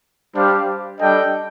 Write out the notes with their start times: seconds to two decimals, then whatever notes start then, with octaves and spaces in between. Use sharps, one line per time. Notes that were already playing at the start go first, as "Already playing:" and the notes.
0.36 G3 D4 G4 C5 F5
1.00 G3 D4 A4 D#5 G5